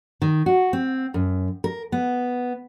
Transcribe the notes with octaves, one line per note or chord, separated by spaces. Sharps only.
D#3
F#4
C4
F#2
A#4
B3